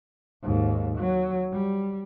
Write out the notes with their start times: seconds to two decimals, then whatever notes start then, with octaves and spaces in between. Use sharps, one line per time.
0.43 D#2 G#2
0.98 F#3
1.53 G3